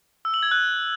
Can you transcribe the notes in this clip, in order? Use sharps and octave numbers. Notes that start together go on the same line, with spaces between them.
E6
F#7
G#6
F#6